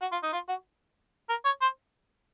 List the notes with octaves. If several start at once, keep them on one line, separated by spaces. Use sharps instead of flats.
F#4
F4
D#4
F4
F#4
A#4
C#5
C5